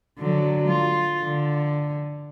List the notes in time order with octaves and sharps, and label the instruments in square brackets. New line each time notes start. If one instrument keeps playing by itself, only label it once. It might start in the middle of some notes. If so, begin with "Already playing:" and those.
[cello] D3 F#3
F4
D3